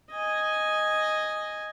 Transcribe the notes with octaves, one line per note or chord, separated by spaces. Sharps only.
D#5 G#5